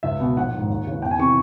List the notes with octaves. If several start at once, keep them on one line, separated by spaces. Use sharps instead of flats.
C#2 E5
B2
A#1 F#5
G#2 D#3
D#2
C#3 E3
E2 G5
G#5
C3 E3 C#6